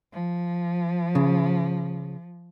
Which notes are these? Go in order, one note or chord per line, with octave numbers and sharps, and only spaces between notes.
F3
C#3